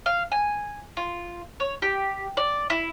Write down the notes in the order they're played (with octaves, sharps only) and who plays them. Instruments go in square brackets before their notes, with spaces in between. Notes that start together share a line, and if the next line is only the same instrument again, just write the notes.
[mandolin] F5
G#5
F4
C#5
G4
D5
E4